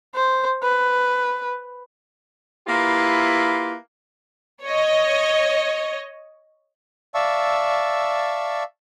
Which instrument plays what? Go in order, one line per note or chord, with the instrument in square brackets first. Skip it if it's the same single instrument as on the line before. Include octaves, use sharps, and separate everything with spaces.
[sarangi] C5
B4
[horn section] A#3 E4 F4 G4 B4
[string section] C#5 D#5
[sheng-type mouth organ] D5 E5 F5 A5 C#6 E6